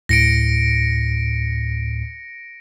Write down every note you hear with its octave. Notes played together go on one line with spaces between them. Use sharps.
D2 A2 A#6 C#7 D7